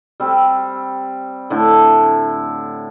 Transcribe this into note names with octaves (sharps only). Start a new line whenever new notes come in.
G3 C4
A2 D3